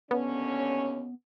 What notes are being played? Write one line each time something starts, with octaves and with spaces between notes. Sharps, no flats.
D#2 D3 B3 C#4